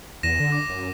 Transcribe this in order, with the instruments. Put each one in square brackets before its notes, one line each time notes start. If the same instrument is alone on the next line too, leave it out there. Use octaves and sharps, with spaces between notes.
[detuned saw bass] E2 [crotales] A#6 D#7 E7
[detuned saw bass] D3
[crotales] D6
[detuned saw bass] F#2